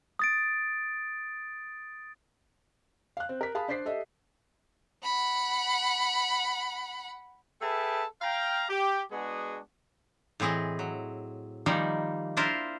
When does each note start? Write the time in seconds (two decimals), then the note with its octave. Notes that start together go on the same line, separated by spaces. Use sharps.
0.19 D#6 A6 D7
3.17 F5 F#6
3.29 C4
3.41 A#4 B6
3.55 G#4 F5 A5 B5 D#6
3.68 D4 C5 D5 B6 C7
3.85 G4 A4 D#5 E5
5.04 F#5 B5
7.61 G#4 A4 B4 E5 G5 A5
8.22 F5 G5 A#5
8.69 G4
9.11 G#3 B3 D4 F#4 G#4
10.40 A2 E3 C4 G#4 D#5
10.79 F#3
11.66 D#3 F3 G3 A#3 D#4
12.37 D4 E4 F4 A#4 C5